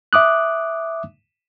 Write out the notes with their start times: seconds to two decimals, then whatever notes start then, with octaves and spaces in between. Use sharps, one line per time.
0.13 E5 D6 D#6 F#6